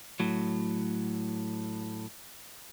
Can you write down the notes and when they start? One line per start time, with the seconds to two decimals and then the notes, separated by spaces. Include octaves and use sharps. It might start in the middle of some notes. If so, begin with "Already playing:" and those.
0.20 A2 F#3